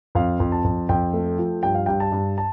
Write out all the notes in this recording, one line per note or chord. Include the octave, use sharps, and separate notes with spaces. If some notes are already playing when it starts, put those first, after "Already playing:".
F2 F5
F2
A5
F2
F2 G5
A3
F3
G2 G5
F5
G2 G5
A5
G2
A5